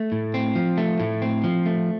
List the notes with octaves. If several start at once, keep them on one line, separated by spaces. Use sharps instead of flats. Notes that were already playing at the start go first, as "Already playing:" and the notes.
Already playing: A3
A2
C4
F3
A3
A2
C4
F3
A3